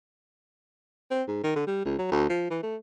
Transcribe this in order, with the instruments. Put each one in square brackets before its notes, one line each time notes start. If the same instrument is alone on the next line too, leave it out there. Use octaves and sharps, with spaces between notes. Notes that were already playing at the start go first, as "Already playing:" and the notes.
[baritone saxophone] C4
G#2
D#3
D3
G3
C#2
F#3
D2
F3
E3
A3